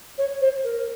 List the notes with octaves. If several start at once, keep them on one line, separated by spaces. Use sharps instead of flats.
C#5
C5
A#4